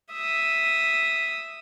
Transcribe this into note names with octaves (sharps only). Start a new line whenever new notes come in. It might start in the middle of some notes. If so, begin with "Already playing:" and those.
E5 D#6